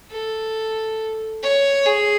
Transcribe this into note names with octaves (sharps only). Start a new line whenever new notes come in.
A4
C#5
G#4